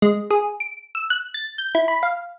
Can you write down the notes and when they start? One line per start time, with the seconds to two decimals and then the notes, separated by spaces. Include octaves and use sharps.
0.02 G#3
0.31 G#4
0.60 D7
0.95 E6
1.10 F#6
1.34 A6
1.58 G6
1.75 E4
1.88 B5
2.03 F5